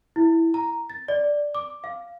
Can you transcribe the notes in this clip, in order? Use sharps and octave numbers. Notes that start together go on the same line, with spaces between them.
E4
A#5
A6
D5
D6
F5